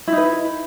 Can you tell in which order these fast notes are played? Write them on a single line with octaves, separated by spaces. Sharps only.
E4 D#4 B4